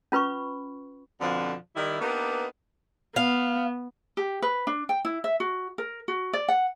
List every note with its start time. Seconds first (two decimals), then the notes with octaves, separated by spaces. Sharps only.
0.12 C#4 F4 B4 B5 C#6
1.21 F2 B2 D3 F3
1.76 D#3 G3 E4
2.00 A#3 B3 D4 D#4 G4 B4
3.16 B3 F5
4.17 G4
4.42 B4
4.67 D4
4.89 G5
5.05 E4
5.24 E5
5.40 F#4
5.78 A#4
6.08 F#4
6.33 D5
6.48 F#5